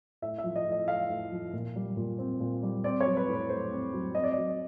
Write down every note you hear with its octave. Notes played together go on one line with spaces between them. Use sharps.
A2 E5
E5
F3
D#5
A2
D#5
A3 F5
A2
F3
A#2
G3
A#2
C4
A#2
G3
C4 D5
F#3 C#5
B4
A2 B4
A3 C5
C4
F#3
C4 D#5
D5
D#5
F#3